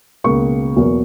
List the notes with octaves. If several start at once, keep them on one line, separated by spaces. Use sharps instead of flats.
C#2 B2 A#3 C#6
E2 B2 F#3 A#3